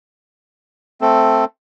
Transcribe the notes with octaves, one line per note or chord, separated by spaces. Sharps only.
A3 C4 A4